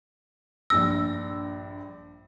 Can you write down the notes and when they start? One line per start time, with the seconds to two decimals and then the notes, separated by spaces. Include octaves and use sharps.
0.70 A#1 G2 E6 A#6